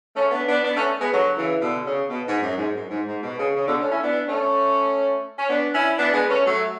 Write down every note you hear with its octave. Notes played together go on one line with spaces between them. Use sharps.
A3 C#4
B3 D4
B3 D4
B3 D4
A3 C#4
G#3 B3
D3 F#3
C#3 E3
B2 D3
C#3
B2
G#2
F#2
G#2
F#2
G#2
G#2
B2
C#3
C#3
B2 D3
A3 C#4
C#4 E4
B3 D4
A3 C#4
C#4
B3 D4
C#4 E4
B3 D4
G#3 B3
A3 C#4
F#3 A3